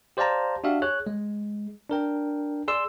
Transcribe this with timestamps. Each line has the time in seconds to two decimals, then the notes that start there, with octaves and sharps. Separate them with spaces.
0.17 G4 C5 D5 F5 A5 A#5
0.64 D4 F#4 G4 E5 F5
0.82 G#4 C#5 F#6
1.07 G#3
1.90 D4 A#4 G5
2.68 G#4 D5 C6 E6